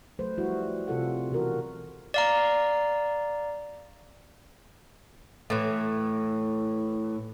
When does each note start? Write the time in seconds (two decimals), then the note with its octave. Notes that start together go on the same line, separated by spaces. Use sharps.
0.19 F#3 A3 B4 C5
0.38 F3 G3 E4 F#4
0.88 C3 F4 A4 F#5
1.31 B2 E3 F#4 A#4
2.14 D5 F5 A#5
5.50 A2 E3